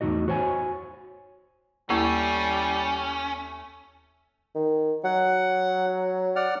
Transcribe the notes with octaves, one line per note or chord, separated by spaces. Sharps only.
E2 A2 D3 D#4 F#4 D#5
F#4 C5 C#5 G5 G#5
D#2 G3 A3 A#3 C#4 E4 G#5 D#6
D#3
F#3 F#5
D5 F#5 F6